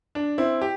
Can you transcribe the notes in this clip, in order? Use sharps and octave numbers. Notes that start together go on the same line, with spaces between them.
D4
C4 E4
G4